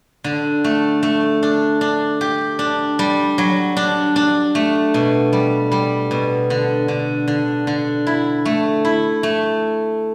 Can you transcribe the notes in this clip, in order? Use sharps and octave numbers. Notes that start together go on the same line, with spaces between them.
D3
A3
A3
D4
D4
G4
D4
G3
F#3
D4
D4
A3
B2
G3
G3
B2
D3
D3
D3
D3
E4
A3
E4
A3